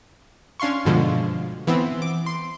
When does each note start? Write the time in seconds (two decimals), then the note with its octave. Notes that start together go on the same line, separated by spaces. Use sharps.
0.60 C#4 D4 F5 C6 C#6
0.85 G2 B2 D3 F3 G#3
1.67 E3 B3 C4
2.02 D6
2.26 C6